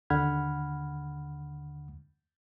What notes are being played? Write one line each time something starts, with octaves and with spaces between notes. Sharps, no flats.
D#2 D3 F#5 B5 F6 G#6